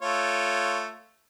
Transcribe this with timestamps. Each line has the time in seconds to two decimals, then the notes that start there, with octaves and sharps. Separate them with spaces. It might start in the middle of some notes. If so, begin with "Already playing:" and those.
0.02 A3 F4 C#5